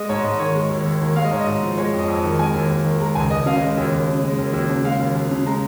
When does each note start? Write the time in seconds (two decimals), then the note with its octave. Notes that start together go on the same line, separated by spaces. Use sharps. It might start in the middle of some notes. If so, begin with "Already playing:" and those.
Already playing: G#3 D#5
0.09 G#2 C#5
0.24 G#2 D#5
0.39 D#3 C#5
0.55 G#3
0.70 D#2
0.86 D#2
1.01 D#3
1.16 G#3 F5
1.24 D#5
1.31 G#2 C#5
1.40 D#5
1.47 G#2
1.63 F3
1.78 G#3 C#5
1.93 F2
1.99 D#5
2.08 F2
2.24 D#3
2.39 G#3 G#5
2.54 D#2
2.70 D#2
2.84 D#3
3.00 G#3 A#5
3.15 C#2 G#5
3.31 C#2 D#5
3.46 C#3 F5
3.61 G#3 D#5
3.78 D#2
3.92 D#2
4.08 C#3
4.23 G#3
4.38 D#2
4.53 D#2
4.70 C#3
4.84 G#3 F5
5.00 D#2
5.15 D#2
5.31 C#3
5.46 G#3 A#5